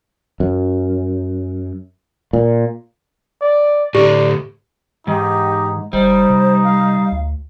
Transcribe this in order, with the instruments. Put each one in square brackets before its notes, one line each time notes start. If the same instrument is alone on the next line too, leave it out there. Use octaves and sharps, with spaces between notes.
[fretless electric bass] F#2
A#2
[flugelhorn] D5
[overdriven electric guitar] A2 D3 [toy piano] G4 [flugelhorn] D5
[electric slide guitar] G#2 [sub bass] E3 [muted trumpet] D#4 [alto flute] G4
[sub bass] F#1 [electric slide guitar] G3 [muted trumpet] D#4 [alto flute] C5
[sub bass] C3
[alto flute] F5
[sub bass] D2